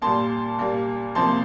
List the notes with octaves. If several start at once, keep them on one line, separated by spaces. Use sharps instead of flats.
A#2 G3 A#3 A5 C6
A#2 G3 A#3
C2 C3 F3 A#3 A5 C6